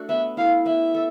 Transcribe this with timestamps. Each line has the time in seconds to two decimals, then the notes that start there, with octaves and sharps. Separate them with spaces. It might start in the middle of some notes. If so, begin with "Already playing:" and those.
Already playing: A3 D4 F#4 A4
0.09 B3 E5
0.37 E4 A4 F5
0.66 B3 E5
0.95 A4